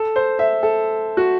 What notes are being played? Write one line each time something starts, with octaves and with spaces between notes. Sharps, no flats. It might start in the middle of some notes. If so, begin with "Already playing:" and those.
Already playing: A4
C5
E5
A4
F#4